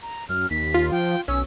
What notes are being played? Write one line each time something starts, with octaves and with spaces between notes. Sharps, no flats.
A#5
F#2 F6
D#2 B6
F4
F3 G5
B1 C#4 E6